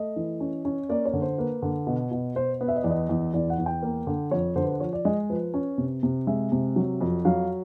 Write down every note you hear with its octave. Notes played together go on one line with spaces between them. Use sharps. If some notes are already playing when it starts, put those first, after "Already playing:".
Already playing: A3 D#5
E3
C#4
C#4
A#3 D5
C#5
D3
C5
A#3 B4
D3
B2
B2
B2 C5
B3
E5
D#5
E2 D5
D#5
E2
E2 D5
F#5
E2
G5
A#3
D3
F2 C#5
D3 C5
B4
C5
F3 C#5
D5
G#3 D#5
F3 B4
C#4
C3
C3
G#3 E5
C3
F#3
F2
F#3 F5